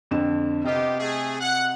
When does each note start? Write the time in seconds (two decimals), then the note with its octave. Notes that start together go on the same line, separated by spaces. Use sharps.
0.11 F2 D3 E7
0.64 C3 B3 F4 G4 D#5
0.99 A3 G#4
1.40 F#5